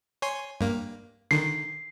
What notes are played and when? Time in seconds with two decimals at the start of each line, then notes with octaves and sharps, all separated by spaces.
0.22 C#5 G#5 C6
0.61 G2 A#3
1.31 D3 D#3 C7